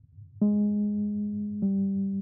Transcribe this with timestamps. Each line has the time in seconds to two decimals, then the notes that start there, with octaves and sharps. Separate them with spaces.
0.42 G#3
1.62 G3